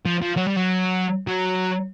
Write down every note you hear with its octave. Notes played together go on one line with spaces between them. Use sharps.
F3
F3
F#3
G3
F#3
F#3